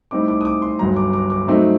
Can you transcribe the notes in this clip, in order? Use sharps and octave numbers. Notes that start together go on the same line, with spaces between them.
A2 G3 C4 D#4 D6
D6
D#6
D6
C6
G1 G2 F#3 A#5
D6
D6
D6
G2 F#3 A3 C4 D#4